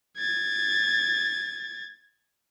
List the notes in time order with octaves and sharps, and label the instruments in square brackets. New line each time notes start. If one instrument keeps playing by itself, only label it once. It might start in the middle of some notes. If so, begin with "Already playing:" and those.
[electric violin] G#6 A6